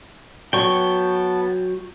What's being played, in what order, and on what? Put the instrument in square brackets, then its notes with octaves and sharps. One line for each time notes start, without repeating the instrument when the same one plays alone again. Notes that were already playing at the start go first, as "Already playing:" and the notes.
[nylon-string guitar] F#3 [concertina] B3 A5 [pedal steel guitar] G5 C#6